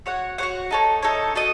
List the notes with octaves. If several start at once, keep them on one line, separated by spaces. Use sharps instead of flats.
F#4 C#5 F#5
F#4 C#5 F#5
D#4 A4 C#5
D#4 A4 C#5
F#4 A4 D#5